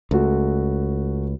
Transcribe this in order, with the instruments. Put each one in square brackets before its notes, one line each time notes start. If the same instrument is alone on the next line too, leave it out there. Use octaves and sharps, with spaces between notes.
[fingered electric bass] C#2 [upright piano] A3 F#4